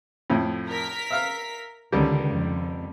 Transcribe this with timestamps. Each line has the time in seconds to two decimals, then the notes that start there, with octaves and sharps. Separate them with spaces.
0.30 F2 A2
0.69 A#4 B6
1.10 E5 F5 F6
1.92 C#2 D3 D#3 G3
2.30 F2